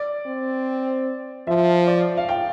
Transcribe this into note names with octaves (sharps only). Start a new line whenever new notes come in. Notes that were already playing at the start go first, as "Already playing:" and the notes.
Already playing: D5
C4
F3 E5
D5
F5
G5